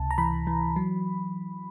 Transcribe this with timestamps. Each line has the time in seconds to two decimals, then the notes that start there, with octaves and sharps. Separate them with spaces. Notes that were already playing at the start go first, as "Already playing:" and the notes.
Already playing: C#2 C3 A5
0.11 A#5
0.18 E3 B5
0.47 E3
0.76 F#3